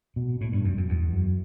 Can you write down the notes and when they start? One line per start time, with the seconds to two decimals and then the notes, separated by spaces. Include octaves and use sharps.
0.16 B2
0.41 A2
0.52 G2
0.65 F#2
0.77 F#2
0.89 E2
1.13 F#2